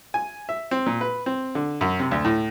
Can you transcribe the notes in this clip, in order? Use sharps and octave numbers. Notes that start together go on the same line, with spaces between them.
G#5
E5
C4
A#2
B4
C4
D3
F#2
C3
D2
A2